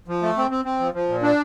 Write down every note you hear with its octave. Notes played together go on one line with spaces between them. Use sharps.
F3
A3
C4
C4
C4
F3
F3
A#2
D4